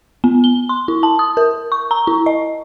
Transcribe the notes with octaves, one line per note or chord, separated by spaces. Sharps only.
B3
G7
C6
E4
A5
D#6
A#4
C#6
A#5
E4
D#5